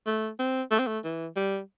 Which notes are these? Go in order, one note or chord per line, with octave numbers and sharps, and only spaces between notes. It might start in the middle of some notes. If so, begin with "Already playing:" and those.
A3
C4
A3
C4
A3
E3
G3